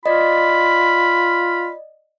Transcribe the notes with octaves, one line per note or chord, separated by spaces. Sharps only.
F4 D5 D#5 B5